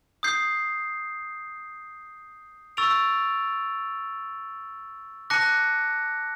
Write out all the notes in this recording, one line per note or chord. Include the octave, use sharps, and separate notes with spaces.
D#6 G6 C7
C#6 E6 A6 D7 F7
A5 D6 F#6 A#6 C#7